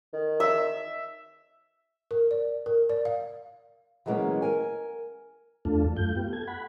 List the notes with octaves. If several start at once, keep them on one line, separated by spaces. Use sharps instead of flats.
D#3
E5
A#4
D5
A#4
D5
F5
E3 F#3 G#3 A#3 B3 C#4
A#4 G#5
E2 A3 D4 F4 A4
F#2 A3 F4 G6
B3 F4 G4
A4 G#6
F#5 B5